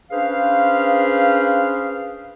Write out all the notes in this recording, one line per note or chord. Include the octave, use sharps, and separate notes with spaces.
C#4 D4 G#4 B4 C5 F5